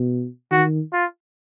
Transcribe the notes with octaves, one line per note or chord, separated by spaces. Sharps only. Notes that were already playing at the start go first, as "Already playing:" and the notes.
Already playing: B2
D#3 F#4
F4